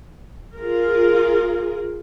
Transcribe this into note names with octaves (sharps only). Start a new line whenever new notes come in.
F4 G#4 A#4